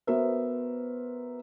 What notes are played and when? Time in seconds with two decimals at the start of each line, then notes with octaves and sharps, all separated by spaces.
0.07 B3 F#4 A#4 C5 E5